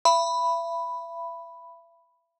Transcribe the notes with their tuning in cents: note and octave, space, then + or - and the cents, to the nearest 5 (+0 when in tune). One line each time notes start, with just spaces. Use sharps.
E5 +35 B5 +0